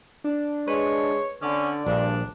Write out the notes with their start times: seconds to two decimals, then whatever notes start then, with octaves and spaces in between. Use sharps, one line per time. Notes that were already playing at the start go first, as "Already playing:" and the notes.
0.24 D4
0.68 G#3 B4 C#5
1.42 D3 C#4 D5
1.86 A#1 G2 D4